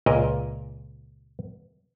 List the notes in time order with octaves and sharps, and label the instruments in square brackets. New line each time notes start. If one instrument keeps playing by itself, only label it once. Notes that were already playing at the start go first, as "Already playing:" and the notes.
[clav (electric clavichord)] C#2 A#2 A#4 D#5